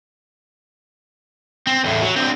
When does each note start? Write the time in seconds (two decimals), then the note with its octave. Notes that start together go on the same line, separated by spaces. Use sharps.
1.67 C4
1.84 E2 A2
2.02 F#3
2.16 D3 C4